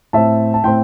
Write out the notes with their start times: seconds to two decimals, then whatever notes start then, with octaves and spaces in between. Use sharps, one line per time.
0.13 A2 A3 C4 E5 A5
0.54 A5
0.64 A2 A3 C4 G5 C6